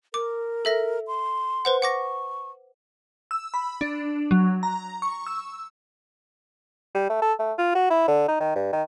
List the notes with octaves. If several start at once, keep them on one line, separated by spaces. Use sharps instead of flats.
A#4 D6
A4 E5 A#6
C6
B4 C5 F#5
F#5 C#6 D6 A#6
E6
B5
D4
F#3
A#5
C#6
E6
G3
A3
A4
A3
F4
F#4
E4
D3
D#4
D#3
G2
D#3